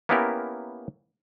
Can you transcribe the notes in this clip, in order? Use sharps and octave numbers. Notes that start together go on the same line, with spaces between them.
A#3 B3 C#4 E4 G4 A#4